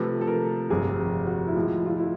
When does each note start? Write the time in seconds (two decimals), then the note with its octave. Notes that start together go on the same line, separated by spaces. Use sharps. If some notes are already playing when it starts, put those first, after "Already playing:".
Already playing: C3 F3 A3 B4
0.21 A4
0.27 A#4
0.70 G1 F2 C3 G#4
0.98 G4
1.27 F#4
1.47 E4
1.55 A2 F3 G#3 F4
1.86 F4
1.98 E4